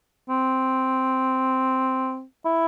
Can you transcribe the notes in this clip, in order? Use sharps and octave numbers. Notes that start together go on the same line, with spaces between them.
C4
E4